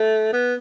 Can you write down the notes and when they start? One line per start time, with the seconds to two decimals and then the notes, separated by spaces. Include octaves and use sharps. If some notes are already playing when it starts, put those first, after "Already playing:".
Already playing: A3
0.33 B3